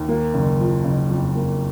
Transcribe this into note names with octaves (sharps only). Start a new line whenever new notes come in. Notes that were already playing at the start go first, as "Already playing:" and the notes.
Already playing: D#2
A#3
F#1
F3
F#1
F2
A#3